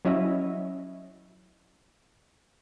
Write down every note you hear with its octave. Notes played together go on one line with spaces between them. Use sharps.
F#3 C#4 E4 D#5 E5